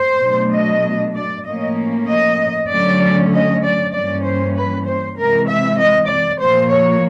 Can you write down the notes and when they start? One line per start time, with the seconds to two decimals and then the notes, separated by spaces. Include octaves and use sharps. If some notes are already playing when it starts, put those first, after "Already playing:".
Already playing: C5
0.21 B2 F#3 A3 D4
0.52 D#5
1.15 D5
1.45 A2 F3 A#3 C#4 D#5
2.07 D#5
2.69 D3 F#3 A3 C#4 D5
3.30 D#5
3.62 D5
3.93 G2 E3 G3 A#3 C#4 D5
4.24 C5
4.55 B4
4.86 C5
5.16 C3 E3 G#3 A#4
5.48 E5
5.78 D#5
6.09 D5
6.40 A#2 F3 A#3 C5
6.71 C#5